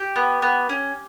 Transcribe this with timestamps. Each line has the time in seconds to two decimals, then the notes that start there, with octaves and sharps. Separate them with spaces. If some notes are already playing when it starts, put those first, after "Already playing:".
Already playing: G4 G5
0.16 B3
0.42 B3
0.69 C#4